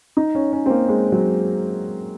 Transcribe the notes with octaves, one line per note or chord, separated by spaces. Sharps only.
D#4
C#4
C#4
C4
A#3
G#3
F#3